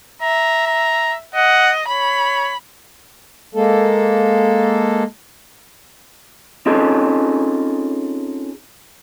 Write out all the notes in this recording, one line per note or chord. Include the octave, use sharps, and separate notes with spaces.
E5 A#5
A#5
D#5 F#5
C#5 B5
G#3 A#3 A4
C4 C#4 D#4 F4 G#4 A4